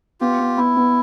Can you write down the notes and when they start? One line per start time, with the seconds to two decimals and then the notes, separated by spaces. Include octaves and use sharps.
0.21 B3 F4 G4
0.39 B3
0.57 B3 E4
0.77 B3